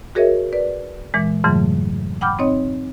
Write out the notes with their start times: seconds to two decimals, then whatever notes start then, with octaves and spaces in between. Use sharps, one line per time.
0.15 F#4 G#4 A#4 C#5 D#5 E5
0.53 B4 D5
1.14 A#2 E3 G#3
1.44 F2 G#2 C#3 E3 F#3 A3
2.21 F#5 G5 B5 D6 F6 G6
2.39 C4 D#4 C#5 D#5